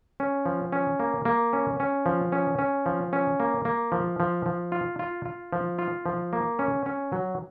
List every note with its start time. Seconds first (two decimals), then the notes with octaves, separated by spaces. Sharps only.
0.20 C#4
0.46 F3
0.72 C#4
1.00 A#3
1.25 A#3
1.53 C#4
1.80 C#4
2.06 F3
2.32 C#4
2.59 C#4
2.86 F3
3.13 C#4
3.40 A#3
3.65 A#3
3.92 F3
4.20 F3
4.46 F3
4.72 F4
4.99 F4
5.25 F4
5.53 F3
5.79 F4
6.06 F3
6.33 A#3
6.59 C#4
6.86 C#4
7.12 F#3